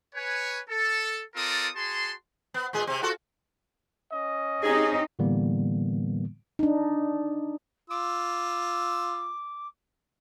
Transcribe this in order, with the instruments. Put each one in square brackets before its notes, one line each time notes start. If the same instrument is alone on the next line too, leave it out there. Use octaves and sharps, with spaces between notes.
[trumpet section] B4 C#5 G#5
A4
C4 F4 A4 A#4 D5 D#6
F#4 G#4 A5 C6
[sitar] B3
A#2 G#3 G#4
C3 C4
F4 F#4 A4
[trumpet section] C#4 D#5
[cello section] C4 D#4 G4 [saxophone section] G#4
[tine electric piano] A2 D3 E3 G3 A#3 B3
[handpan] D4 D#4
[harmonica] F4 E6 [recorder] D6